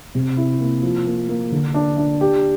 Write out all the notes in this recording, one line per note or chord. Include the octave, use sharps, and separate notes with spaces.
C3
E4
A#3
F3
A#3
A#3
D3
D4
D4
G4